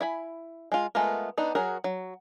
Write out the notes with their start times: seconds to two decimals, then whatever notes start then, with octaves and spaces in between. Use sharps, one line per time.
0.01 E4 G#5 B5
0.72 G#3 F4
0.95 G#3 A3 B3 F4 A#4
1.38 B3 D4 D#4
1.55 F#3 F#4 G#4 A#4
1.84 F#3